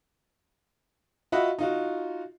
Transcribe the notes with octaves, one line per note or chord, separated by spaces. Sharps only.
F4 F#4 D#5 E5 F#5 B5
D#4 F4 F#4